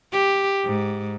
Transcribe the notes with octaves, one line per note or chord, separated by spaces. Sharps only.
G4
G#2